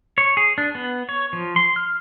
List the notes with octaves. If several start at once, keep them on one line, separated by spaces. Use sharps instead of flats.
C#5
G#4
D4
B3
C#5
F3
C6
F6